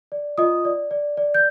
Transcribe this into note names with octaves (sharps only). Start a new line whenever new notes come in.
D5
F4 D#5 D#6
D5
D5
D5
G6